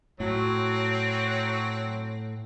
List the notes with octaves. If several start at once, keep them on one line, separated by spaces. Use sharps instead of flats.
A2 F#3 C4